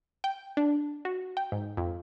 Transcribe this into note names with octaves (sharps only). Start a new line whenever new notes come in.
G5
D4
F#4
G5
G#2
F2